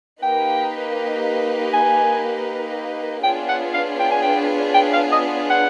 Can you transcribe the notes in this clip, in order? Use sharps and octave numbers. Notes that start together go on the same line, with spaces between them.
A#3 D#4 G4 B4 D#5 G5
G#5
B3 D4 F4 G#4 C#5 G5
F#5
F5
G5
G#5
G5
G5
F5
D#5
F#5